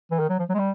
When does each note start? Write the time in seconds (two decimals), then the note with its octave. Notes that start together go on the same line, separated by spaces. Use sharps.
0.11 E3
0.20 D#3
0.30 F#3
0.39 F3
0.49 F#3
0.54 G#3
0.59 G3